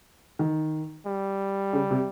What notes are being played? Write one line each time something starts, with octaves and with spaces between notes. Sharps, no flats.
D#3
G3
C#3
C3